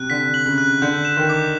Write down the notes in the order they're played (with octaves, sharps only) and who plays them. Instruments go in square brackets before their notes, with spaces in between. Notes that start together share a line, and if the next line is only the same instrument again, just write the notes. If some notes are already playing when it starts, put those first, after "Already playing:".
Already playing: [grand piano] C3 [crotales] F#6
[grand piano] D3 [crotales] B6
[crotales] F#7
[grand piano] C#3
[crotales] F#6
[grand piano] D3 [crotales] G6
[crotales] E7
[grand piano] D#3
[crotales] D6